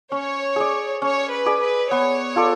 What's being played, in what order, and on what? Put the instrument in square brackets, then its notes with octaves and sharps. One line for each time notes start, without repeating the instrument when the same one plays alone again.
[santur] C#4 [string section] C#5
[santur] G#4 D5
[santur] C#4 [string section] C#5
[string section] B4
[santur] G#4 D5
[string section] B4
[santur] B3 [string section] C#5
[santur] F4 A4 D5